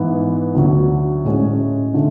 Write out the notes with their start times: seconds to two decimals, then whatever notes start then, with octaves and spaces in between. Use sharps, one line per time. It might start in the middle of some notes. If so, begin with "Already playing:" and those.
Already playing: G#2 E3 B3
0.55 D2 D3 F#3
1.24 A2 G#3 C#4
1.94 D3 A3